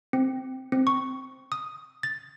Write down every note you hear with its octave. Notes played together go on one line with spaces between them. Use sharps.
C4
C4
C#6
D#6
A6